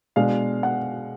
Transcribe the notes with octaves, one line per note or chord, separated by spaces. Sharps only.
B2 G#3 B3 D4 F5
F#5